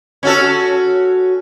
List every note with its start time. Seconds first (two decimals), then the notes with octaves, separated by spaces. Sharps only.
0.23 C#4 F#4 A4